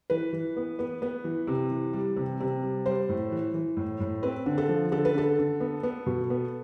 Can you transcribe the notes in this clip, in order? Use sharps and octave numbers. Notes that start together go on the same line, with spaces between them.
E3 B4
E3
B3
B3
B3
E3
C3
E3
G3
C3
C3
G3
G3 C5
A2
E3
E3
A2
A2
C4 B4
D3
A4
F3
D3 A4
B4
D3 A4
D3
B3
B3
B2
B3